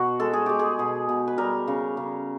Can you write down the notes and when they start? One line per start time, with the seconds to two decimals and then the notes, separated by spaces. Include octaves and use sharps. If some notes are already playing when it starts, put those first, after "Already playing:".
Already playing: B2 F#4
0.20 G#3 A4
0.33 G#4
0.46 G#3 G4
0.59 G#4
0.79 B2
1.09 B2
1.28 B4
1.38 G3 A#4
1.68 C#3
1.97 C#3